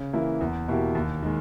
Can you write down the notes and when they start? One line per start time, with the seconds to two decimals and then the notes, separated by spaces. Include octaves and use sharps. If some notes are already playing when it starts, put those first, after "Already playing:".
Already playing: C#3
0.13 E3 A#3 E4
0.41 E2
0.68 B2 A#3 E4 G4
0.95 D#2
1.23 D#3 G#3